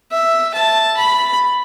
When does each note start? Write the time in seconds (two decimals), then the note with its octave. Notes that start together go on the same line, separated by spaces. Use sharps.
0.11 E5
0.54 A5
0.97 B5